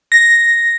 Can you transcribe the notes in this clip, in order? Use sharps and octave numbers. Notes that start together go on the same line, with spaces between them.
A#6